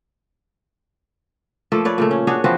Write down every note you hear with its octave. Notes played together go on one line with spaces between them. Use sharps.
F3 A3 A#3 A4
B4 C#5 D5
A#2 C#3 A3
C#4
D4 F#4 G#4 C#5
E3 F3 C4 F#4